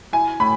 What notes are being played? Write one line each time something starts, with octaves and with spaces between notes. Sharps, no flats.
E4 G#5
A2 B5